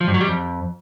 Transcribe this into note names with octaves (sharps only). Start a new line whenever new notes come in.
F3
G2
F#3
G3
F2